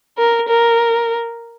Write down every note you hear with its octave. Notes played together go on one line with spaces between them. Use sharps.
A#4
A#4